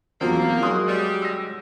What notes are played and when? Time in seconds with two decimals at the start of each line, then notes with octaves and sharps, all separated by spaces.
0.21 E2 F3 F#3 A#3 C4
0.62 F#3 G#3 C6 D#6 F#6
0.88 G3
1.22 E6 A#6